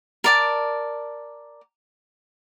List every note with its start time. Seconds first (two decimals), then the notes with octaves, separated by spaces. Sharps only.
0.24 A#4 D5 A5